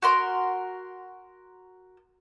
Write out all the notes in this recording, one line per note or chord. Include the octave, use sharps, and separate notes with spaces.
F#4 A#4 C6